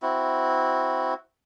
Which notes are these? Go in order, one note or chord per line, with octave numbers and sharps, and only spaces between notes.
C4 E4 F#4